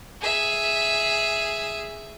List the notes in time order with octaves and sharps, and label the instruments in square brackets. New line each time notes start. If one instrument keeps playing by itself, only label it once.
[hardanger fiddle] G#4 E5